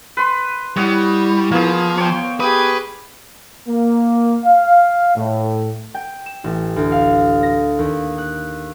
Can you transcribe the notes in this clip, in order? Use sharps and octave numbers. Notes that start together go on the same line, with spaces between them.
B4 C6
G3 E4 C#5 D#5 F#5
F3 A#3 B3 G#4
B3 C5 C#5 G5
G4 G#4 B4 D#6
A#3
F5
A2
G5
E7
A1
D2
F5
A#6
D#2
F#6